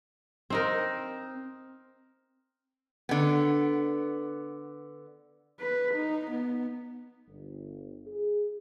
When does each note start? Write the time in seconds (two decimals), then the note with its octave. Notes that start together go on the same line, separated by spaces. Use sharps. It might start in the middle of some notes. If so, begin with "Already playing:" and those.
0.50 C4 D#4 A#4
3.09 D3 B3
5.60 B4
5.94 D#4
6.30 B3
7.28 G1
8.07 G#4